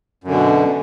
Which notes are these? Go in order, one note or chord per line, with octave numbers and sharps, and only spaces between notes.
F#2 B2 D3